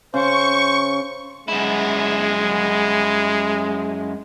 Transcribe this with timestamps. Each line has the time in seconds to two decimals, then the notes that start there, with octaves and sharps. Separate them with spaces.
0.14 C#3 C5 C#6
1.48 F#2 G#3 E4